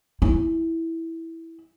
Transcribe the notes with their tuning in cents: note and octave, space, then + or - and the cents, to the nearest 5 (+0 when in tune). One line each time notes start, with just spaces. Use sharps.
E4 -5